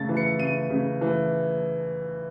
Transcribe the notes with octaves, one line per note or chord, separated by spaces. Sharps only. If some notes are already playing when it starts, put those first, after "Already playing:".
Already playing: C#3 A3 A6
E3
C#7
C#3 D#7
C#3
E3